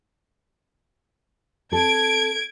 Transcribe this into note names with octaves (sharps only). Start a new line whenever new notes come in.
C4 A4 G#6 D7